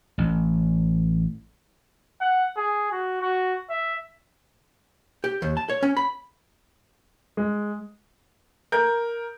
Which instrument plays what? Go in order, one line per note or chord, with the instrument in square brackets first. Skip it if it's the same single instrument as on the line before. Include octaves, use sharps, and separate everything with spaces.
[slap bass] A1
[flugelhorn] F#5
G#4
F#4
F#4
E5
[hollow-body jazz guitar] G4
D#2
A5
C#5
C#4
B5
[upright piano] G#3
A#4 G6